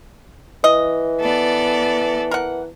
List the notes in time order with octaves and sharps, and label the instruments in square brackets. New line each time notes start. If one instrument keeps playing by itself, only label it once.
[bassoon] E3 [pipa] D#5
[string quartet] B3 A4 D5
[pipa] A#4 F#5